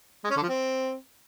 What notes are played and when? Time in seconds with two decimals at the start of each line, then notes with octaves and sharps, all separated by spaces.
0.24 G#3
0.30 C#4
0.36 D3
0.43 F3
0.49 C4